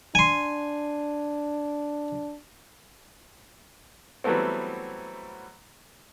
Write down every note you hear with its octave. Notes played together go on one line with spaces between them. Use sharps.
D4 G#5 C6
E3 F#3 G3 A3 B3 C4